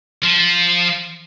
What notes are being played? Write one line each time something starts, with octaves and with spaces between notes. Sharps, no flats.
F3